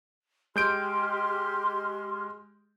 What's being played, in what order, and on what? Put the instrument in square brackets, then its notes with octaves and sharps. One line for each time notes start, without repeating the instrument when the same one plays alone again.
[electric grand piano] G#3 G6 D7 [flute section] G4 C6 F6